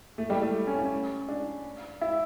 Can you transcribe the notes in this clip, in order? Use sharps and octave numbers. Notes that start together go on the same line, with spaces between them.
A3
G3
A3
C#4
C#4
D4
E4